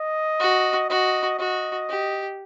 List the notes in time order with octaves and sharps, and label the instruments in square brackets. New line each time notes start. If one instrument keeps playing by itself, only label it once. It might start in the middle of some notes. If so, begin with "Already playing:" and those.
Already playing: [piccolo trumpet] D#5
[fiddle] F#4
[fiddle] F#4 [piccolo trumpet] D#5
[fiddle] F#4 [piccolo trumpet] D#5
[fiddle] G4